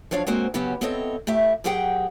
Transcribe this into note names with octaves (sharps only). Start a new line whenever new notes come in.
F3 F#3 D4 C#5 F5
G#3 A#3 C4 C#4 F#4 C5
C#3 F#3 B3 C#4 F#4 G4
B3 C4 E4 A4 C#5 D#5
A3 E4 G4 E5
F#2 F#3 G4 G#4 F#5 G5